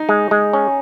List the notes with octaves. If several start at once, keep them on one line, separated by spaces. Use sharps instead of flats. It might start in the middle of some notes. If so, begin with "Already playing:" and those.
Already playing: D#4
G#3
G#3
C#4